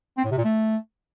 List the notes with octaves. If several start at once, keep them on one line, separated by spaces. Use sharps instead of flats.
C4
A2
C3
A#2
A3